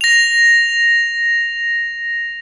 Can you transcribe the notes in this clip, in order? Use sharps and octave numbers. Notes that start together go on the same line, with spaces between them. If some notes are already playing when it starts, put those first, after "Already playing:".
A#6 F7